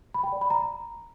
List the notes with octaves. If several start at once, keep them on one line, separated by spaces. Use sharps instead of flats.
B5
G5
D5
B5
A#5